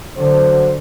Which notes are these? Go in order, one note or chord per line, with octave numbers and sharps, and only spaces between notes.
D3 F#3 F#4 C5